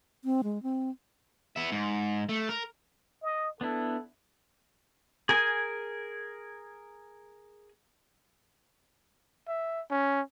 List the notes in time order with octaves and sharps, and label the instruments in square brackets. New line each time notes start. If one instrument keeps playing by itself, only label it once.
[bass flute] C4
G#3
C4
[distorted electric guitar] B3 E5
G#2
A3
A#4
[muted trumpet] D#5
[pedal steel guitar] B3 D4 E4 [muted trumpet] A4
[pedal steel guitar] G#4 A#4 G#5
[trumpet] E5
C#4